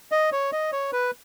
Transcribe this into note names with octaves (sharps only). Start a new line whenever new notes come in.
D#5
C#5
D#5
C#5
B4